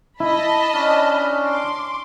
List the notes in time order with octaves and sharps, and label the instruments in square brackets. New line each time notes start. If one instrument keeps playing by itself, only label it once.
[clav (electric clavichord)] E4 [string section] D#5 A5 B5
[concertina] C#4 D4 F6
[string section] C6 D6